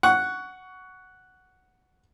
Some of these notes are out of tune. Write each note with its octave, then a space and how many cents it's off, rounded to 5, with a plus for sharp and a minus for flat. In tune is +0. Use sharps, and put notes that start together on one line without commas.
F#5 +0 C#6 +20